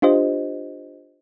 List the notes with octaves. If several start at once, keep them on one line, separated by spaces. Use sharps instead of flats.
D4 F4 G4 C5 D#5